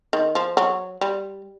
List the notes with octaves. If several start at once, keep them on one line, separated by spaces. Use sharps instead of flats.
D#3
F3
F#3
G3